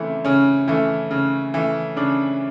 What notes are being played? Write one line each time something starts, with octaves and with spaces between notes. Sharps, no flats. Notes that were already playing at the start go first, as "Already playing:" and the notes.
Already playing: C#3 E3 A3 C4
C#3 C#4
E3 A3
C#3
E3 A3
C#3 D4